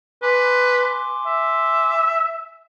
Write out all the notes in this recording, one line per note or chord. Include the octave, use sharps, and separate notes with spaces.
B4 G#5 C6 D6
E5